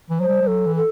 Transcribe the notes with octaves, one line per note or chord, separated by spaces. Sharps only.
E3
F#3 C5
G3
G3
F#3 A4
E3
A4